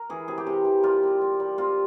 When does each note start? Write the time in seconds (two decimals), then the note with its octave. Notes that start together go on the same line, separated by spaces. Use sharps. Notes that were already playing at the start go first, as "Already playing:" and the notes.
Already playing: A#4
0.10 E3 G#4
0.28 C3 G#4
0.38 G4
0.47 C3
0.65 E3
0.83 G3 F4
1.03 C4
1.21 C4
1.40 G3
1.58 C4 F4